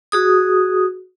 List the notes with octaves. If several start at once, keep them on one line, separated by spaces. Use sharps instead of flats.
F#4 G#4 D#6